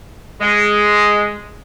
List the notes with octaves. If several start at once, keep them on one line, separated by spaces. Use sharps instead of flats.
G#3